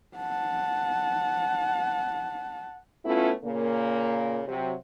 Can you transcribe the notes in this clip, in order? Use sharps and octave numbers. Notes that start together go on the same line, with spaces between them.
F#5 A5
A3 B3 C#4 E4 F4
A#2 C#3 A#3
C3 F#3